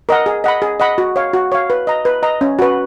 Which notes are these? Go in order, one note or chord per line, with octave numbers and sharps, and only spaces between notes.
A#4 D#5 F#5
G#4
D#5 F#5 B5
G#4
D#5 F#5 B5
F#4
C#5 F5
F#4
C#5 F5
B4
D#5 A#5
B4
D#5 A#5
C#4
F#4 B4